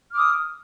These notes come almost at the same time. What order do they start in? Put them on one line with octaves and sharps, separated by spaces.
F6 D6 D#6